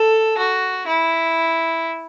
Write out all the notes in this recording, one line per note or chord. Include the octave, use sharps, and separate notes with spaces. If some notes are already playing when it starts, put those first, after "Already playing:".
Already playing: A4
F#4
E4